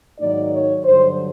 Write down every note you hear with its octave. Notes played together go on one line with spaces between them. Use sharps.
G#2 D#3 F#3 A#3 D#4 D5
C#5
G2 D3 F#3 C5